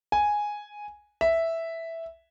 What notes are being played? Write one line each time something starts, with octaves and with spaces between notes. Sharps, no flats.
G#5
E5